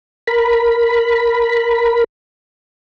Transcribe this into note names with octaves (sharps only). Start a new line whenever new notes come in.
A#4 B5